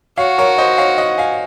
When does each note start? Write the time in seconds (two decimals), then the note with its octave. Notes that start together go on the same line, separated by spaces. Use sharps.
0.18 F#4 C#5 F5
0.38 A#4 C#5
0.58 C5 D#5
0.78 C#5 F5
0.98 D#5 F#5
1.18 F5 G#5